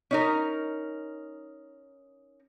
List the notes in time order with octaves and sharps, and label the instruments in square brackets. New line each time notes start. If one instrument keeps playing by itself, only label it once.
[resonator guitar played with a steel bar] C#4 D#4 A#4